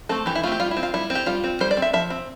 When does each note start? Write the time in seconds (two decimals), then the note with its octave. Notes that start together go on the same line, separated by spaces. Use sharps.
0.09 A3 C4 A4
0.26 E3 G4
0.35 E4
0.43 A3 F4
0.47 C4 G4
0.60 G3 F4
0.71 E4
0.77 C4
0.83 F4
0.94 G3 E4
1.10 C4
1.15 G4
1.26 G3 F4
1.44 C4
1.60 G3 C5
1.71 D5
1.77 C4
1.82 E5
1.93 F3 E5
2.10 C4